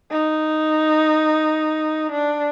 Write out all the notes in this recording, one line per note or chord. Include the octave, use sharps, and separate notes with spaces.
D#4
D4